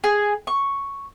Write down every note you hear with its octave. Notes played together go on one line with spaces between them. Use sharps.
G#4
C#6